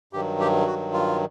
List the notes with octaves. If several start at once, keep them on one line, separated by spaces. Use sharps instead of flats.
G2 D#3 F#3 G4
G4
F#4
F4